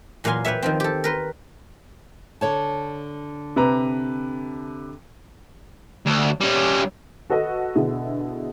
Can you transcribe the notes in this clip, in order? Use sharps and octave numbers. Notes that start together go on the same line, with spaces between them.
E2 A#2 F#3 F5 G#5 C6
E4 G4 B4 C#5 E5
D#3 F3 C4
G4 A4
A#4 B4 C6
D3 C#5 A5
C3 B4 A#5
D2
G3 C#4
F#4 A4 B4 D#5 F#5
B2 D3 E4 G#4